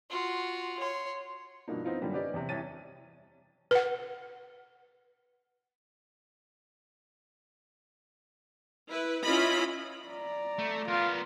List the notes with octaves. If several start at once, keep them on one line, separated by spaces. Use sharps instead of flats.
F4 F#4
C#5 C6
G2 B2 F3 A#3 D4 D#4
B3 C4 D#4 F4
F#2 D3 G3 A#3
C#4 G4 B4 D5 D#5
E2 C3
C2 E3 C#5 A6 D#7
B4 F#5
E4 B4
C#4 E4 F4 D#5 B5
D5 A#5
A3
B3 F4 A#4